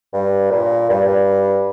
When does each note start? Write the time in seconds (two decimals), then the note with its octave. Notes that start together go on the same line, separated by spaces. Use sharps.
0.13 G2
0.51 A#2
0.90 G2